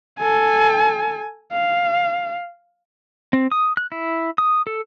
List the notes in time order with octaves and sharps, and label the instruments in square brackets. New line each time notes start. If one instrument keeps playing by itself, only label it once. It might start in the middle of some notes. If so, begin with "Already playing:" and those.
[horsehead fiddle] A4 G#5
F5
[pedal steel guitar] C4
D#6
F#6
E4
D#6
A4